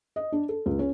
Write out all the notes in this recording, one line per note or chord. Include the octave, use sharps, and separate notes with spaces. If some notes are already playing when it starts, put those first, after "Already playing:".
D#5
D4
A4
C#2
C#4